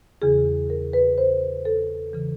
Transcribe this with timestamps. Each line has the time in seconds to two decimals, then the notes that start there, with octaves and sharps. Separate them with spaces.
0.22 E2 C#3 E3 G#4
0.70 A#4
0.93 B4
1.18 C5
1.65 A4
2.13 C#3 E3